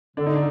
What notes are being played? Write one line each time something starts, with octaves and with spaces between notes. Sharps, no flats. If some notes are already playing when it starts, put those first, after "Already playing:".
D3 D4
D#4
D4